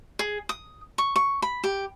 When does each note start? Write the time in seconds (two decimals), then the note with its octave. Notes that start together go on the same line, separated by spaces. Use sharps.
0.19 G#4
0.49 D#6
0.98 C#6
1.16 C#6
1.42 B5
1.64 G4